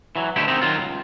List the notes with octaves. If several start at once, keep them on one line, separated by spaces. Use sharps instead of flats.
E3 F#3
D2 B2 D3 A3 E4 G4
C3 D#3 C4 D#4
D#3 F#3 F4
C#2 G#2